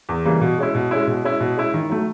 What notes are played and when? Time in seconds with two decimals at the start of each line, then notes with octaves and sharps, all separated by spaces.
0.09 E2
0.25 C#3 E3 G3 A#3
0.41 B2
0.58 G#3 C#4 E4
0.75 B2
0.91 G#3 C#4 E4
1.07 B2
1.24 G#3 C#4 E4
1.40 B2
1.57 G#3 C#4 E4
1.74 D#3
1.90 F#3 A3